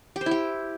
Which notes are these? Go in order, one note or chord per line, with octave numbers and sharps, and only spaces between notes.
G4
C5
E4
G4